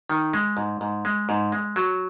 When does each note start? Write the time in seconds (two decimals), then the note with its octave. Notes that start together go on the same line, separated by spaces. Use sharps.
0.10 D#3
0.33 G#3
0.57 G#2
0.81 G#2
1.05 G#3
1.29 G#2
1.52 G#3
1.76 F#3